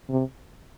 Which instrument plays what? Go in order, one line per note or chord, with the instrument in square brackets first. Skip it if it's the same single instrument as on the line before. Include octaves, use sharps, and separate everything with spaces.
[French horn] C3